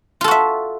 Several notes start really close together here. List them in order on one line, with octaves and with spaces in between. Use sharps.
F4 A4 F#4 E5